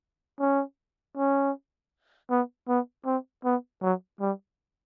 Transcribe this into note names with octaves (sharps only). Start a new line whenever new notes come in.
C#4
C#4
B3
B3
C4
B3
F#3
G3